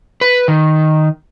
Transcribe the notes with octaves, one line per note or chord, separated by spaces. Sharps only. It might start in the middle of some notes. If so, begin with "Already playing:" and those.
B4
D#3